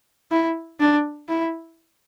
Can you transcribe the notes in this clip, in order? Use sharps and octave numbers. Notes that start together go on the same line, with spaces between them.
E4
D4
E4